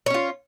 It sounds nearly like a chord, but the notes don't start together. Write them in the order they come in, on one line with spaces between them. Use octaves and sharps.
C#5 C#4 F4